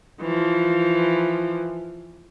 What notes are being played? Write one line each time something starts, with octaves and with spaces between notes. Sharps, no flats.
E3 F3